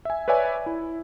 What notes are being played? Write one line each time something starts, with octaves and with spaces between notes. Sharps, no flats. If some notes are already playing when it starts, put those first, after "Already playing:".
E5 G#5
B4 C#5 D5 E5 G#5
E4